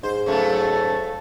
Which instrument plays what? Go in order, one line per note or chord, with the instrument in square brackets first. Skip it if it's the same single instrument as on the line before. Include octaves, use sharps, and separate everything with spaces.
[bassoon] G#2 [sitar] C5
[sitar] C#3 F#3 A3 [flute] A4